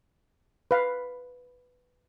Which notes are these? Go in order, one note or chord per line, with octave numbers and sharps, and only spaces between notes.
B4 F5